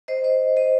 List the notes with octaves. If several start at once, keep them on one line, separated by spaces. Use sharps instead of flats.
C5 D#5
C5 D#5
C5 D#5